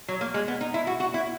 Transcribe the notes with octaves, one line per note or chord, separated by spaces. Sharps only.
F#3
A#3
G#3
B3
D#4
E4
F#4
F#4
E4